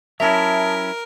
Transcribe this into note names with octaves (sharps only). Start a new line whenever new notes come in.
F#3 C#4 E4 A#4 E5 A5 D#6 G#6